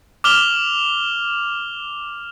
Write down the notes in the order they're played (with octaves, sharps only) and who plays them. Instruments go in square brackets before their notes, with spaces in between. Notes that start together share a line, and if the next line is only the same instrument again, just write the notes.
[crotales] D6 F6 F7 G7